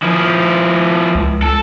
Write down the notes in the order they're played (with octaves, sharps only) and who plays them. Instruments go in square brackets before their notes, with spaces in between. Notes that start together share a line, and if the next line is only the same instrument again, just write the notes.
[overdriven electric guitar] F3 E4
[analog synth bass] C#2
[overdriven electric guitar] A4